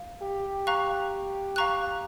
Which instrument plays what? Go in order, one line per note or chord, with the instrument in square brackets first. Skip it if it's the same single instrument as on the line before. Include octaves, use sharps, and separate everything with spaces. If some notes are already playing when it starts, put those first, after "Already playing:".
Already playing: [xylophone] F5
[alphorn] G4
[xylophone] F5 A#5 C#6 F#6
F5 A#5 C#6 F#6